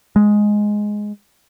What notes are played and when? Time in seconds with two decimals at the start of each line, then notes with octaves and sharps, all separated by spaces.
0.16 G#3